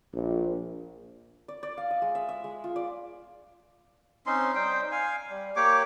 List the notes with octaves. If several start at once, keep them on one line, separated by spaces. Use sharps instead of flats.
A#1
D5
D5
F5
D#5
G#3
E5
E5
G#3
F4
D5
C4 C#4 D#4 C6
G3 D#4 C5 G5
F5 G#5
G3
A#3 G4 C#5 D6